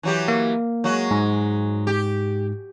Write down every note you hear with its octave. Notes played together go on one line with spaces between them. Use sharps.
E3 F#3 G4
A#3
F#3 G#3 F#4
G#2
G4